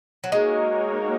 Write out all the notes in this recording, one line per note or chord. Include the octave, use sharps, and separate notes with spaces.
F#3
G#3 A#3 D#4 F#4 A#4 C#5